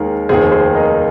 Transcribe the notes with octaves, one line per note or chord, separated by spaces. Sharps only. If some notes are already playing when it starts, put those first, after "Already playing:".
Already playing: D#2 D#3 G#3 A#4
F1 D#2 D#3 G#4 C5
G#4 C5
A#4 D#5